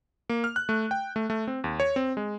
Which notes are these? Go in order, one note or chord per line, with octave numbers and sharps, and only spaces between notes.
A#3
F6
F#6
A3
G5
A3
A3
C4
D#2
C#5
C4
G#3